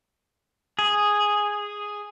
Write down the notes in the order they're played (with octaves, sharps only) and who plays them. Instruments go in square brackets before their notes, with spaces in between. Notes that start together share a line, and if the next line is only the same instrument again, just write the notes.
[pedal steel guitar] G#4